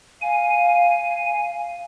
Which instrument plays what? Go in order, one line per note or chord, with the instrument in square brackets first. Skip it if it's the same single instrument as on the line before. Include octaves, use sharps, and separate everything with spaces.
[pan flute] F5 [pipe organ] G#5